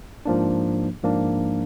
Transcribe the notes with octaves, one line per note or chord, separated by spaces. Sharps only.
G#2 F3 A#3 D4
G#2 F3 A#3 D4